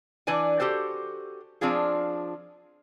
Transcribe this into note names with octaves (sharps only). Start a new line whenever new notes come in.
E3 D4 B4 D5 G#5
F#4 G4 A4 C5
F3 C4 D4 F4 G#4